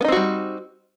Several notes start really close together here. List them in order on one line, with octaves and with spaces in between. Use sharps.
B3 D#4 C4 F#4 G3